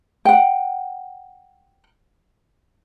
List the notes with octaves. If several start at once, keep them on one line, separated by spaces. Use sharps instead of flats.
F#5 G5